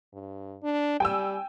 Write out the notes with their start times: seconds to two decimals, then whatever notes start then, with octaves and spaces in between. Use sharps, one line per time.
0.14 G2
0.63 D4
1.00 G3 G5 G#5 E6